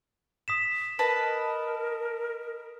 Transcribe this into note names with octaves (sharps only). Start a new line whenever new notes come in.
D#6 B6 E7
A#4 B4 D#5 A5